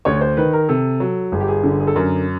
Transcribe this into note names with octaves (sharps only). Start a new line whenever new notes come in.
D2 C#5
C5
D#3 B4
A#4
C3 A4
F#3
G1 G#4
G4
G#4
D3
G#4
A4
F#2 A#4